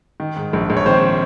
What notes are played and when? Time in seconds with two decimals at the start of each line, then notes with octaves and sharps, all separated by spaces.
0.20 D#3
0.36 G#2
0.53 A#1
0.70 A#1
0.77 C#5
0.86 D#3 C4 C5